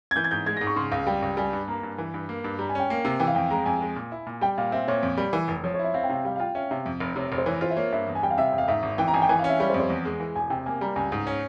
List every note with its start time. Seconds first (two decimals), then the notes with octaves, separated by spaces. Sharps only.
0.11 G#6
0.16 E3 G6
0.24 G#6
0.31 G#2 G6
0.46 G#3 G#6
0.57 A#6
0.61 G#2
0.67 C#6
0.76 C#3 C6
0.92 C#2 F5
1.07 G3 G5
1.22 C#2
1.37 G3 G#5
1.53 G2
1.68 A#3 A#5
1.83 G2
1.98 E3
2.14 G2
2.29 A#3
2.44 G2
2.59 G3 A#5
2.69 G#5
2.75 C#4 G5
2.90 A#3
3.05 C3
3.20 E3 G5
3.27 F5
3.35 F2 G5
3.50 G#3 A#5
3.66 F2 G#5
3.81 G#3
3.96 A#2
4.12 E4
4.27 A#2
4.41 G3 G5
4.58 A#2 F5
4.72 C4 E5
4.88 A#2 C#5
5.03 F2
5.17 G3
5.33 E3
5.48 F1
5.63 F3 C#5
5.74 C#5
5.79 E4 E5
5.94 C4 F5
6.03 G5
6.09 C3 F5
6.25 G3 F5
6.36 F5
6.40 F4 G5
6.55 C#4 E5
6.70 C3 E5
6.86 F2
7.00 F1
7.16 C3 C#5
7.32 F1
7.38 C5
7.46 E3 C#5
7.61 F4 C5
7.70 E5
7.77 A#3 C#5
7.92 G2 E5
8.07 E2
8.15 G#5
8.23 G3 G5
8.30 F5
8.38 C3 E5
8.52 E1
8.58 F5
8.68 G#2 E5
8.83 G#1
8.98 E3 G5
9.08 A#5
9.14 G#1 G#5
9.22 G5
9.29 E3 G#5
9.39 F5
9.44 C#4 E5
9.60 G3 C#5
9.70 C5
9.74 F2
9.80 C5
9.90 E2
10.05 G#3
10.20 E3
10.35 E1 G#5
10.50 C3 G5
10.66 A#3 G#5
10.81 G3 A#5
10.96 C#2 G#5
11.12 G#2
11.27 C#4